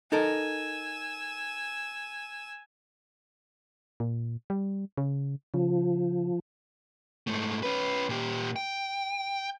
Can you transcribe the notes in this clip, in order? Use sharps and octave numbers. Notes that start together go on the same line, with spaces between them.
D#4 A4 A#4 G#5 E6
A#2
G3
C#3
C#3 F3
G#2 A3
C#4 B4
A#2 G4
G5